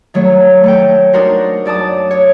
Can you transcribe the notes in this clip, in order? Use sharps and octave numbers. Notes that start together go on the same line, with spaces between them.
D#3 F#3 A3 C#5
A3 C#5 G5
D4 D#4 F#4 A#4 C5
F#2 D5 A5 D#6
C#5